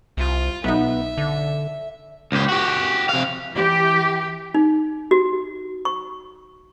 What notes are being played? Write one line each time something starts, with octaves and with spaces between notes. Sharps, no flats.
C2 F4
B1 B3 D#4 E5
D3
C#2 G4
F#4 G4
C3 F5
E3 G4
D#4
F#4
C#6